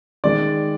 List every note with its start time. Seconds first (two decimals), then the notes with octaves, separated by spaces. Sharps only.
0.24 D#3 G#3 D5